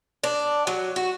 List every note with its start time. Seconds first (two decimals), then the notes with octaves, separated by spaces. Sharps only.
0.24 D4
0.67 F#3
0.96 F#4